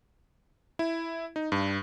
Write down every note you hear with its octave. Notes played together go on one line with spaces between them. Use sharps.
E4
D#4
G2